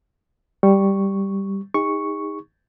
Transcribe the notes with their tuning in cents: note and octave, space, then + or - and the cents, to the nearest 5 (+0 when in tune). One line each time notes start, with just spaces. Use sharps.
G3 +0 C#6 +0
D#4 +20 G#4 -40 C#6 +0